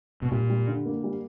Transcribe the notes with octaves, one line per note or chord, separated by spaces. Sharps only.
B2
A#2 G3
G3
D3
A#3
G3